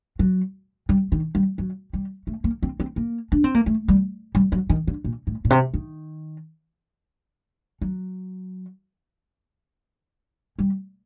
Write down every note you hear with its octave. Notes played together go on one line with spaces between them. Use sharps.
F#3
G3
D#3
G3
F#3
G3
A3
A#3
C4
C4
A#3
D4
C4
A#3
A3
G3
G3
F#3
D#3
D3
A#2
A2
A#2
C3
D#3
F#3
G3